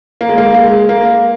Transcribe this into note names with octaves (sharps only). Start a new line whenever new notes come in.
A#3
G#3
A#3
G#3
A#3